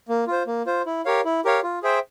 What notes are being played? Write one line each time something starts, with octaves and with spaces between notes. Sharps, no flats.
A#3
F4 C5
A#3
F4 C5
E4
G4 A#4 C#5 F5
E4
G4 A#4 C#5 F5
F4
G#4 C5 E5 G5